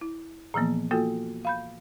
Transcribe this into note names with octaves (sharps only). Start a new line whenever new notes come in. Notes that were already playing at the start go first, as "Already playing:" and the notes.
E4
A#2 E3 F3 A#3 B3
A#3 F4 F#4 A4 G5
F5 B5 G6